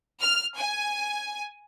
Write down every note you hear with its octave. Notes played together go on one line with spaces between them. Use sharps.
F6
G#5